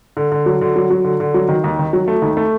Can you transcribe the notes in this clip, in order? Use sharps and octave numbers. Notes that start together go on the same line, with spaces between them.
D3
D3
F#3
D3
F#3
F#3
D3
D3
F#3
D#3
D#2
D#3
F#3
A3
D#2
A3